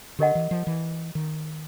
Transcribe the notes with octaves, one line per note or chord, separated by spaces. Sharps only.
D3 G4 A#4 D#5 F#5
E3
F3
E3
D#3